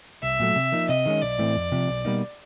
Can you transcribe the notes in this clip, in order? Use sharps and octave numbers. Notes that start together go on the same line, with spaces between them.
C2 E5
A#2 F#3 A3
C3
F3 A#3 D#4
C3 D#5
D#3 G#3 C#4
B1 D5
A2 E3 A3 C4
F2
C3 F3
B1
B2 G3 A#3 D#4